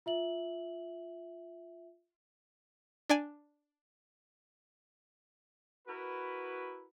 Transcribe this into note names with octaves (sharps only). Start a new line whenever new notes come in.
F4 E5 F#7
D4 D5 G#5
E4 F#4 A#4 B4